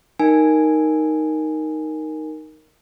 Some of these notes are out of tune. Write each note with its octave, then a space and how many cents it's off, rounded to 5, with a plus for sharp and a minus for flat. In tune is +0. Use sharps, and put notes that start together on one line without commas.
D#4 +0 A#4 +0 G#5 +0